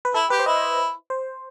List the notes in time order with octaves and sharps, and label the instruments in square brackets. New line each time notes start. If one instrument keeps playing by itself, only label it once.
[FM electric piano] B4
[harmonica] E4 [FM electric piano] A4
[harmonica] G4 [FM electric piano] B4
[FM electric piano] C5
[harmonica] E4 [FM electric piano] D#5
[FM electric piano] C5